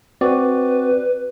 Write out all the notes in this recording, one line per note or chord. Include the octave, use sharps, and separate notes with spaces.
C4 F#4 B4 D5